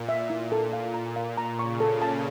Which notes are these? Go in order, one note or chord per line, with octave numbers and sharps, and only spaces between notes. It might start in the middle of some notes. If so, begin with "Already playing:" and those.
Already playing: A#2
E5
E4
A4
F5
A#5
F5
A#5
C#3 C#6
A4
C#3
A5